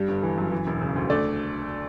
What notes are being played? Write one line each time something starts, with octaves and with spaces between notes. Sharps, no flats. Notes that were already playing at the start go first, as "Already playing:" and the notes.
Already playing: G2 G3
G1
E3
F#2
E3
E1
C#3
D2
A3 D4 D5